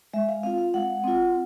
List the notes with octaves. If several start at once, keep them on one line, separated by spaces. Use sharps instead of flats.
G#3 E5
F5
C4 F4 F5
F5
G#3 F#5
C4 F4